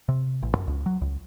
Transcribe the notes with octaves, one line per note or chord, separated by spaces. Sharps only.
C3
A1
F#2
C#2
F#3
C#2